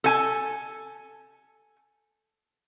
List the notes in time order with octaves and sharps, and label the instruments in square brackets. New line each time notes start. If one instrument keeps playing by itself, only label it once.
[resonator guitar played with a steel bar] A4 G#5